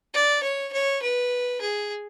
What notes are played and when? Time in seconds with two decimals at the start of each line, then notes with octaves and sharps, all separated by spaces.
0.14 D5
0.43 C#5
0.72 C#5
1.02 B4
1.61 G#4